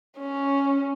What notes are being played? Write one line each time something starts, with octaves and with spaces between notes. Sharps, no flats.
C#4